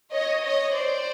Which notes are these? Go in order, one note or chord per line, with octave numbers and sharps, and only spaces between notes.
C#5 D#5
C#5 D#5
C5 D5